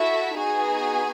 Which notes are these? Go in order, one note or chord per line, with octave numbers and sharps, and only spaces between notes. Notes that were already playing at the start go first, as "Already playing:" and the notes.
Already playing: E4 F#4 A4 E5
B3 D#4 F#4 G#4 G#5